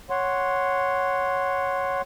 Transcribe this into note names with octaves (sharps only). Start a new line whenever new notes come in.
C#5 F#5 C6